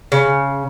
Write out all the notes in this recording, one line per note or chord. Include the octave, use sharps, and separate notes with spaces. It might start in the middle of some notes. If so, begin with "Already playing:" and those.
C#3